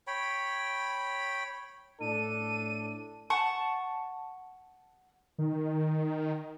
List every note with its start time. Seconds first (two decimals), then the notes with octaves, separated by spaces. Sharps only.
0.07 C#5 G5 B5
2.01 A2 D4 A4 D#7
3.30 F#5 A5 C#6
5.38 D#3